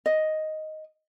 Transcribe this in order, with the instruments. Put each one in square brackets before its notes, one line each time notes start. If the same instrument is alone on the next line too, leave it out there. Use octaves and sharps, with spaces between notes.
[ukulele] D#5